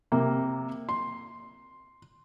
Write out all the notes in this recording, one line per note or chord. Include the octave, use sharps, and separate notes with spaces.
C3 A#3
C6